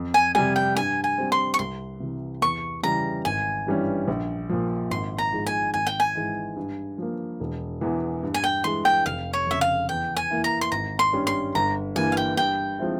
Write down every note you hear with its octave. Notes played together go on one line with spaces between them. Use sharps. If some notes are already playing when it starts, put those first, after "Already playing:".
Already playing: F2
G#5
C3 G3 G#5
G5
G2 G#5
G#5
G3 C4
C6
C#6
C2 C6
C3 E3
E2 C#6
C#3 E3 G3 A#5
G#1 G#5
G2 E3 G3 C#4
A#1
A#2 F3
G#1 C6
A#5
G#2 F3 G#3
G#5
G#1 G#5
G5
G#5
G#2 E3 G#3
G2
F3 A#3
E1
E2 E3
G2
G#5
G5
E3 G#3 C6
G5
F1 F5
C#5
F2 C#3 E5
F5
E2 G5
G#5
E3 A#3 E4
A#5
C6
G#1 A#5
C6
G2 G3 C#4
C6
G1 A#5
G2 E3 A#3 G#5
F5
G5
G2 G5
F3 G#3 C4 E4